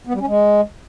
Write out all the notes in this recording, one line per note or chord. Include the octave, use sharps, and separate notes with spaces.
B3
G3
C#4
G#3